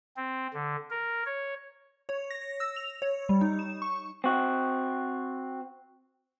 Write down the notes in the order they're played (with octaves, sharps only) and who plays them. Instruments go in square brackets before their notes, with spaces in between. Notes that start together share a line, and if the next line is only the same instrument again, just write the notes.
[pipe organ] C4
D3
A#4
C#5
[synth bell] C#5
A#6
E6
F7
C#5
G3
D#4
E7
C#6
[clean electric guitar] C4 F#4